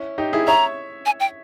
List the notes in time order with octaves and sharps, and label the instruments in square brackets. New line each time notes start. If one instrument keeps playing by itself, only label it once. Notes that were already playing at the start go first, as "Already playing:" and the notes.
Already playing: [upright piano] C#4 E4
D#4 G4
E4 G#4
[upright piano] C#5 E5 [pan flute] A#5
[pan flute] G#5
G5